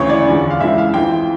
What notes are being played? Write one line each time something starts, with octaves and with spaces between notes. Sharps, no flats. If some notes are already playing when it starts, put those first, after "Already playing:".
Already playing: D2 C#3 E3 C#5
D5
E2 D3 F3
F5
C#2 C#3 E3 E5
F5
F2 E3 G5